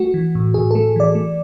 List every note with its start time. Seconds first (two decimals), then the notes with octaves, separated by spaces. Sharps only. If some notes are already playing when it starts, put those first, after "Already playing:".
Already playing: A3 F#4
0.14 E3
0.35 A2
0.54 A2 G#4
0.71 A3 A4
0.96 E3 D5
1.15 A3